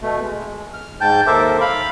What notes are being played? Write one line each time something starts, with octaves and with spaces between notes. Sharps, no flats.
B2 A3
G#3
F6
G#2 G5 A5 G6
D#2 A4 A#4 C5 E5 D6
F5 B5